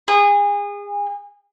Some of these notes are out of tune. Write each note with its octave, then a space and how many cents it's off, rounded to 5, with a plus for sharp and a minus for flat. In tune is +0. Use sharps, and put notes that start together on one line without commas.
G#4 -30